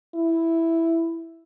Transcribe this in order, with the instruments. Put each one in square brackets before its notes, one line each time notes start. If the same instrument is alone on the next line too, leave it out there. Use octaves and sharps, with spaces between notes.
[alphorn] E4